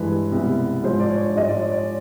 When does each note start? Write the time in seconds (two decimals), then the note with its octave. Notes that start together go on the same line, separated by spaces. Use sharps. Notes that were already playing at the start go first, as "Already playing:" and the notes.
Already playing: G2 E3 G#3 B4
0.32 C2 B2 G#3
0.84 G#2 F3 G#3 C5
1.00 D5
1.10 C#5
1.36 G#2 F3 G#3 D#5
1.48 D5
1.59 C#5
1.72 D5